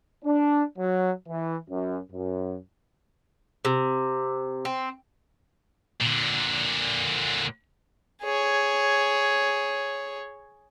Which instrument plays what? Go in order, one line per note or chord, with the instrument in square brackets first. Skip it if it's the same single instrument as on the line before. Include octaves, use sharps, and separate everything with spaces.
[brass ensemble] D4
F#3
E3
F#2
F#2
[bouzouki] C3
C4
[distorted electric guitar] A#2 D3
[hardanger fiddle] G#4 C#5